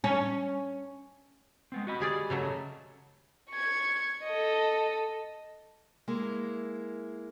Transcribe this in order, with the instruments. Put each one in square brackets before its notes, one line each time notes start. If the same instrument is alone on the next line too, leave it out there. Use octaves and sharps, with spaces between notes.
[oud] C#4
[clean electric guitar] G#3 B3 C4
F#4 D#5 B5
[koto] G3 G#4 D5
C#3 F#3 A3
[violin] C#6 G#6
A4 D#5
[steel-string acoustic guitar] G#3 A#3 E4